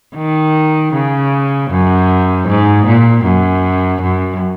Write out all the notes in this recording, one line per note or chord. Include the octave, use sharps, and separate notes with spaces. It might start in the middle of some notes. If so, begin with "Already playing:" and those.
D#3
C#3
F#2
G#2
A#2
F#2
F#2